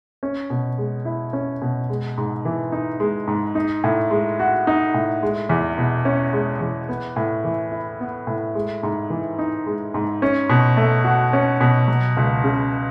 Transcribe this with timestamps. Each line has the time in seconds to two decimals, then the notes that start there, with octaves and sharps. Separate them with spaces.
0.23 C#4
0.50 B2
0.78 G#3
1.05 E4
1.33 C#4
1.62 B2
1.90 G#3
2.18 G#2
2.45 E3
2.72 D#4
3.00 G#3
3.27 G#2
3.55 D#4
3.84 A2
4.11 G#3
4.40 F#4
4.67 D#4
4.94 A2
5.23 G#3
5.49 E2
5.78 B2
6.05 C#4
6.33 G#3
6.61 E2
6.89 B3
7.16 A2
7.44 E3
7.72 E4
8.00 B3
8.27 A2
8.55 G#3
8.83 G#2
9.10 E3
9.39 D#4
9.66 G#3
9.94 G#2
10.22 C#4
10.50 B2
10.77 A3
11.04 F#4
11.33 C#4
11.61 B2
11.88 F#3
12.17 C#2
12.44 C#3